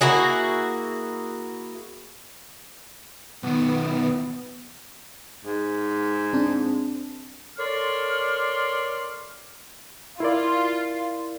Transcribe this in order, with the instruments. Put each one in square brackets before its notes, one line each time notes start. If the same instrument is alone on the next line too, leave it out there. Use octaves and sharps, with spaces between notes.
[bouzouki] A#3 E4 F#4 G#4
[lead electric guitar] B1 D#3 [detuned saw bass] B3
[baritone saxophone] G#2
[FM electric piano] C4 D4 A5
[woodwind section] A4 A#4 C#5 D5 C6 F6
[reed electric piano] E4 A#4 D5 [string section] F4